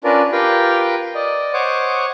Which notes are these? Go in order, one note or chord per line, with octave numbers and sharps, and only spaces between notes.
C#4 D4 F4 A#4 B4 D5
F4 G4 A#4 B4 F5 G5
D5 D#5
C5 C#5 D#5 F#5 D6